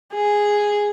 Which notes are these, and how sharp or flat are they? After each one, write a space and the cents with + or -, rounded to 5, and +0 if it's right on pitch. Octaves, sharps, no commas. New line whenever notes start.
G#4 -5